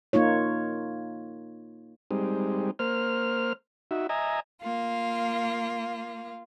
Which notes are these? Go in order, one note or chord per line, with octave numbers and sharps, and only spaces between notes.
A#3 D#4 F4 C#5
G3 G#3 C4 D#4
A#3 C5 F6
D#4 F#4 E5
D#5 E5 G#5 A#5
A#3 F4